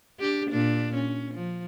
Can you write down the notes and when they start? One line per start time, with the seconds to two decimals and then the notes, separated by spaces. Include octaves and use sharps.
0.19 D4 G4
0.50 A#2 D4
0.94 C#4
1.34 F3